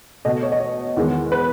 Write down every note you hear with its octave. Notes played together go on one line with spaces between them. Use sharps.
B2 A3 D#5
C#5
D#5
C#5
E2 D#3 G#3 B3
B4